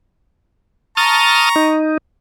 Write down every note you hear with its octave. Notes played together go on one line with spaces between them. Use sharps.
A5 A#5 C#6 D#6 F6
D#4